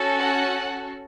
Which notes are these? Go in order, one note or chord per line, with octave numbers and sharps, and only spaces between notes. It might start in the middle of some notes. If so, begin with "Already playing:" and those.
Already playing: C#4 F#4 A4
F#5